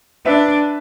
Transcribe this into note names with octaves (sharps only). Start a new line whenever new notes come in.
D4 B4 E5